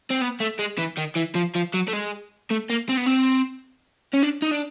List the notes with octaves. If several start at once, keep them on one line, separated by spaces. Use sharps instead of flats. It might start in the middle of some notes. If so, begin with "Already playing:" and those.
C4
B3
A3
G#3
E3
D#3
E3
F3
F3
F#3
A3
G#3
A3
A#3
C4
B3
C4
C#4
D4
D#4
D4